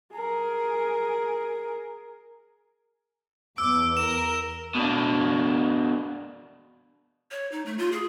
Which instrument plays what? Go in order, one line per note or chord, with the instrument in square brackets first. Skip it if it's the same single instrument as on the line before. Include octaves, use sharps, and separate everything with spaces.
[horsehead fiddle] G#4 A#4
[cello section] E2 [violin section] D6 [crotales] E6
[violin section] A#4 [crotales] E7
[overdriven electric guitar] B2 D4
[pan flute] C#5
D#4
A3
F4
G#4